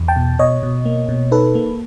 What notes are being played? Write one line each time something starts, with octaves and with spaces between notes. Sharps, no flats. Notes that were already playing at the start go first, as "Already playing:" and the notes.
Already playing: E2
G5 A5
B2
B2 C#5 D#5
B2
A#3
B2
D#4 A4 B4
A#3